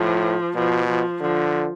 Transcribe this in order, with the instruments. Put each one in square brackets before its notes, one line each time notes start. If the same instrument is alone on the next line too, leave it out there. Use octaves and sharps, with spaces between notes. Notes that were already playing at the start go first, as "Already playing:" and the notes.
Already playing: [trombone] A2 [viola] F3
[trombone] B2 [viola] F3
[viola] F3
[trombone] D3 [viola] F3